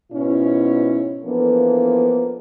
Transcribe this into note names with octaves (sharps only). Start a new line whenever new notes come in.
G#2 B2 C#4 E4
E3 F3 A#3 B3 D4 A4